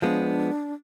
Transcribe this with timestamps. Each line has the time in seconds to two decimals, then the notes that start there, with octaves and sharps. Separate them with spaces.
0.02 F3 G#3 B3 D4